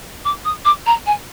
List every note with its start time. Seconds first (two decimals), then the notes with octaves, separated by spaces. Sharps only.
0.25 D6
0.45 D#6
0.65 D6
0.86 A#5
1.06 G#5